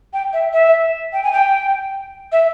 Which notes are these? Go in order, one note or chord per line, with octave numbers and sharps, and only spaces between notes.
G5
E5
E5
G5
G#5
G5
E5